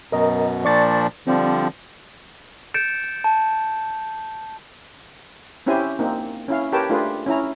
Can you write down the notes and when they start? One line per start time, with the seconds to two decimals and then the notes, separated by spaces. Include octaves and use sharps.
0.12 F#2 B2 A#4 D#5 A#5
0.65 A#2 F3 D4 D5 C#6 A6
1.27 D3 F3 G3 C4
2.74 G6 A6 C#7 D7 E7
3.24 A5
5.66 C4 C#4 E4 G4 C5 G#5
5.99 A#3 C4 D#4
6.48 C#4 E4 F5
6.72 G4 A#4 B4 C#5 G5 A5
6.90 A3 D4 F4 G4 G#4 B4
7.26 C#4 E4 A#5